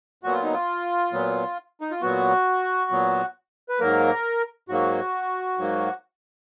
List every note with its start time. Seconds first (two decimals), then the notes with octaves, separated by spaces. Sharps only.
0.24 A#2 F#3 B3 F#4
0.33 F4
0.43 D#4
0.53 F4
1.13 A#2 F#3 B3
1.81 D#4
1.91 F4
2.02 A#2 F#3 B3 F#4
2.91 A#2 F#3 B3
3.69 B4
3.80 G#2 F#3 A#3 A#4
4.69 G#2 F#3 A#3 F#4
5.58 G#2 F#3 A#3